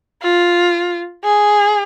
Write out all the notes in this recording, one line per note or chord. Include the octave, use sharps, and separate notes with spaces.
F4
G#4